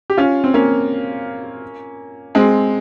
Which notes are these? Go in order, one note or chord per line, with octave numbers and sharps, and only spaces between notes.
G4
C#4 F4
C4
A#3 C#4
G#3 C4